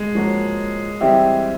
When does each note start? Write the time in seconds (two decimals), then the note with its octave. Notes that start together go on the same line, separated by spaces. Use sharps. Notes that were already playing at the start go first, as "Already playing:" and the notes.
Already playing: G#3
0.15 F3 A#3 C#4 F#4
1.01 E3 G3 C4 E4 G4